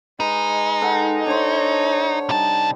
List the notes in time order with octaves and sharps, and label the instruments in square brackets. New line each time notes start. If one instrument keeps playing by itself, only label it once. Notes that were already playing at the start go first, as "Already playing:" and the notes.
[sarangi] G#3 [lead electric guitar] D#4 [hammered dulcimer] B4
[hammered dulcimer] A4 F#5 G5
[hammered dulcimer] D4 C5 [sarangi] C#5
[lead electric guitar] C3 A5 [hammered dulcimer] G3 D#4